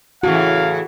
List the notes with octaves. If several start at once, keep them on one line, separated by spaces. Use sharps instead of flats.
A2 C#3 E3 F#4 F5